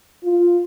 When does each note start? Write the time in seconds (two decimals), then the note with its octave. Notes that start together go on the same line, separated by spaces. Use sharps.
0.23 F4